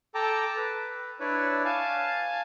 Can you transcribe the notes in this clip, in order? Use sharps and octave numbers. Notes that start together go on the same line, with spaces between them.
A4 G5 A5 A#5 D6
B4
D4 E4 B4 C#5 D5
F5 G#5 A5